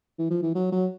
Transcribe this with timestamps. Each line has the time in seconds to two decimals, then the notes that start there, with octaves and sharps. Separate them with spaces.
0.19 E3
0.30 F3
0.42 E3
0.55 F#3
0.72 F#3